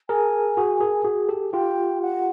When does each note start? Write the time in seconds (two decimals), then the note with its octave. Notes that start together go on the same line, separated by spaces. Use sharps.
0.09 G#4 A#4 G#5
0.57 F#4 G#4
0.81 G#4 A#4
1.05 F#4 G#4
1.29 G4 A4
1.53 F4 G4 G5
2.01 F#5